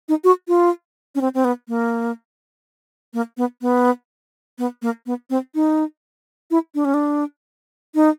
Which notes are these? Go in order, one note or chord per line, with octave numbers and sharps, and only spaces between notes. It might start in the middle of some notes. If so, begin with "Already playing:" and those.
D#4
F#4
F4
C#4
C4
C4
B3
A#3
A#3
B3
B3
B3
A#3
B3
C4
D#4
E4
D4
C#4
D4
D#4